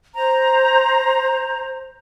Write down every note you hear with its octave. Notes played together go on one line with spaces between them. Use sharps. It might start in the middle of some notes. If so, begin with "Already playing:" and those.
C5 A#5